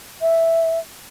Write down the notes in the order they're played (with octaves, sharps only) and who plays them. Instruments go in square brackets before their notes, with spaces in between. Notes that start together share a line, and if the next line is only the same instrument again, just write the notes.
[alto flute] E5